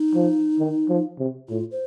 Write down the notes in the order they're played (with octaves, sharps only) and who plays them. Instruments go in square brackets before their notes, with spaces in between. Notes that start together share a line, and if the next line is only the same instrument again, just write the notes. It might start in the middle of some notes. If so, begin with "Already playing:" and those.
Already playing: [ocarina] D#4
[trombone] F3
D#3
F3
C3
[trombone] A2 [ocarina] F4
[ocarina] C5